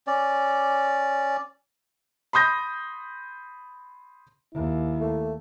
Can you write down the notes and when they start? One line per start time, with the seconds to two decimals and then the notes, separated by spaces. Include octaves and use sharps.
0.07 C#4 D5
2.33 B5 C6 D#6 G6 A#6
4.54 D#2 E4
5.01 A3